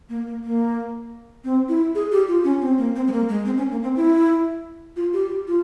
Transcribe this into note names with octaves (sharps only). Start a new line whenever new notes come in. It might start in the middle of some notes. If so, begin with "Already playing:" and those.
A#3
A#3
A#3
C4
E4
G#4
G4
F4
C#4
C4
A#3
C4
G#3
A#3
G#3
C4
C#4
A#3
C4
E4
F4
G4
G4
F4